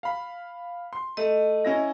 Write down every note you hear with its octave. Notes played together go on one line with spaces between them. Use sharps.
F5 B5
C6
A3 D#5
C#4 E4 A#6